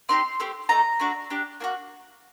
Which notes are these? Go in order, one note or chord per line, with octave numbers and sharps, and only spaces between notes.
C4 D#4 G4 C6
A3 C4 G4
A3 D#4 A4 A#5
A3 D4 F#4
D4 G4
A#3 D4 F#4